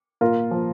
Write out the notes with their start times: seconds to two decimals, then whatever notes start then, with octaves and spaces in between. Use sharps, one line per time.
0.21 A#2 F4 A#4
0.51 F3